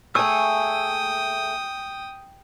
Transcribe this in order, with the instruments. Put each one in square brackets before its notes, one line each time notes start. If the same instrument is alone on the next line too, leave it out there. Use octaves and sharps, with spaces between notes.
[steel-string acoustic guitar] A3 G#4 [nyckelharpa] G5 D#6 [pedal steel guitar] G#5 C#6 E6